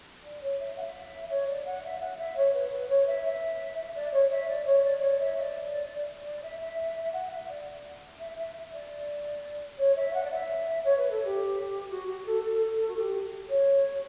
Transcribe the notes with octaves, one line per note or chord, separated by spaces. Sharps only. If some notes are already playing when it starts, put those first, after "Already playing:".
D5
C#5
E5
F#5
E5
C#5
D5
F#5
E5
F#5
E5
C#5
B4
B4
C#5
E5
E5
D5
C#5
E5
D5
C#5
D5
C#5
E5
E5
D5
D5
E5
E5
F#5
E5
D5
E5
E5
E5
D5
C#5
E5
F#5
D5
E5
C#5
B4
A4
G4
F#4
F#4
A4
A4
F#4
A4
G4
C#5